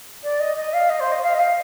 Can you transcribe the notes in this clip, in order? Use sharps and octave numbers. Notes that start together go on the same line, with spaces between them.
D5
D#5
D#5
F5
D#5
C5
D#5
F5
D#5
F5